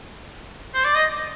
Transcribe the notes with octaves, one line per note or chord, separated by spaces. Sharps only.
C5
D5
D#5